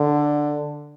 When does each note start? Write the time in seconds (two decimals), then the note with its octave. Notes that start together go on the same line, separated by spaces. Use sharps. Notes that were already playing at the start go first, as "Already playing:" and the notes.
Already playing: D3